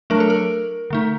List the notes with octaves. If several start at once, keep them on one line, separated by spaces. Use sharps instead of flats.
F#3 A3 D4 A#4
A4
A#4
D3 A3 D#4